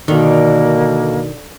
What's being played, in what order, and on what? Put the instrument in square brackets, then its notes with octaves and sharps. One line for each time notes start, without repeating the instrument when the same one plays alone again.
[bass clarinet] B2 [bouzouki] D3 [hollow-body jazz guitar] D#3 [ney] A#3